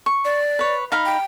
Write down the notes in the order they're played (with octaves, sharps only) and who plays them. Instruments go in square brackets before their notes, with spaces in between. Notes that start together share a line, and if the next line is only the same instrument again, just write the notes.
[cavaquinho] C#6
[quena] D5
[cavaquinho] B4 C#5
D#4 F5 B5
[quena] G5